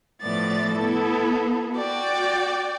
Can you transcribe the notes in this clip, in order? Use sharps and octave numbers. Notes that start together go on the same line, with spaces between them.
A2 F3 B3 D5 A6
B3 E4 A4
F#4 D5 G5